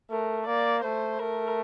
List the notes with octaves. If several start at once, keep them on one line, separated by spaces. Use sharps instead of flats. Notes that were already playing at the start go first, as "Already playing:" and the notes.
A3 A#4
A#3 D5
A3 C5
A3 A#4